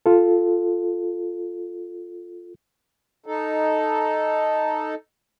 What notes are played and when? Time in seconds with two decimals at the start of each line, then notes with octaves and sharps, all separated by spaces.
0.06 F4 A4
3.26 D#4 A4